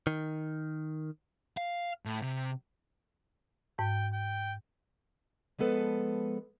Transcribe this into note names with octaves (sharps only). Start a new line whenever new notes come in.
D#3
F5
A2
C3
G#2 G5
G5
F3 G#3 B3 A4 B4